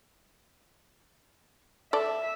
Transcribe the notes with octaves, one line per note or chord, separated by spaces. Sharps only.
A4 D5 E5